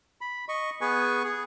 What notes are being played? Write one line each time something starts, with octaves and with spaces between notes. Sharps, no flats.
B5
D#5 C#6
B3 G#4 B4 G#5 C#6
G#4